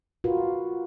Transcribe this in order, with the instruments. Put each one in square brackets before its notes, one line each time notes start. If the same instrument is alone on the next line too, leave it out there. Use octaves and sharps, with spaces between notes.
[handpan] F4 F#4 A#4 B4